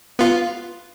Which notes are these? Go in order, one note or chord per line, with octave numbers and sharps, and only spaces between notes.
B3 F4